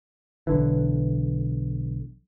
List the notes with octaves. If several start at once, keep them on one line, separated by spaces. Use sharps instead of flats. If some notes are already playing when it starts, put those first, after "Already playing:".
B1 D3 E3